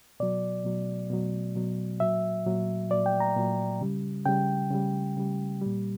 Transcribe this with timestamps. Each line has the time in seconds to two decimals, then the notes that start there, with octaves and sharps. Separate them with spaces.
0.20 B2 F#3 D5
0.65 B2 F#3
1.10 B2 F#3
1.55 B2 F#3
2.00 A#2 F#3 E5
2.46 A#2 F#3
2.90 A#2 F#3 D5
3.06 G5
3.20 A#5
3.36 A#2 F#3
3.81 C#3 G3
4.25 C#3 G3 G5
4.71 C#3 G3
5.17 C#3 G3
5.61 A#2 G3